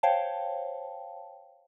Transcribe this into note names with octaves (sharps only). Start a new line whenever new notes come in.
C5 C#5 F5 G5 A5